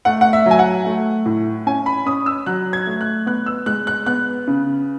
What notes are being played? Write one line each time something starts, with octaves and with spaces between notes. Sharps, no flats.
A3 F#5
F#5
E5
F#3 G#5
F#5
A3
A2
C#4 G#5
B5
C#4 D#6
E6
F#3 F#6
G#6
A3
F#6
B3 F#6
E6
G#3 F#6
F#6
B3 F#6
C#3